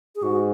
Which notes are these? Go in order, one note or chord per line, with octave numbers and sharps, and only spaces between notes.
G#4
G#2 F#4